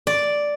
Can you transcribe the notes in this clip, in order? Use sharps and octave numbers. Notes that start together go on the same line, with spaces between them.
D5